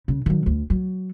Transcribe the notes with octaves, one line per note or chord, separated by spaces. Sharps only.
C#3
D#3 F#3
D2
F#3